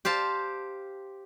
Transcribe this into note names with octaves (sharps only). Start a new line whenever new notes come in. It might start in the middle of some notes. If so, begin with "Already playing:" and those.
G4 C5 F5 A5